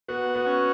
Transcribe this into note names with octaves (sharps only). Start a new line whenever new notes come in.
B3 F#4
B3
C#4